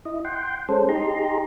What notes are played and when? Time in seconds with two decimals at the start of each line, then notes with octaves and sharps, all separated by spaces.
0.05 E4 D#5
0.25 F#5 G5 C6
0.69 G#3 C#4 A4 C5
0.89 D#4 G4 G#4 A#5 C6